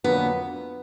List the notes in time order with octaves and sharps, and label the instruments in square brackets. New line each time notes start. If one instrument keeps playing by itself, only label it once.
[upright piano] F2 D3 F#3 A#3 D4 [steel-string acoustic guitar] B3